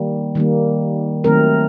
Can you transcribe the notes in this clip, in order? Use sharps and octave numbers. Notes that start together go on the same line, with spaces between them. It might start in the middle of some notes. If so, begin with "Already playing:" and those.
Already playing: D#3 G3 A#3
D#3 G3 A#3
D#3 F#3 A3 C4 A#4